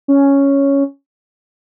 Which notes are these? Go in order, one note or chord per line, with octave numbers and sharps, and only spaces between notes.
C#4